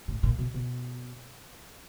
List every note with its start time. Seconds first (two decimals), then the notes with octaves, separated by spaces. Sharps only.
0.08 A2
0.23 A#2
0.39 B2
0.54 B2